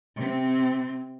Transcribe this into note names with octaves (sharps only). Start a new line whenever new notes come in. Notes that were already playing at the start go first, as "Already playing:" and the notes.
C3 C4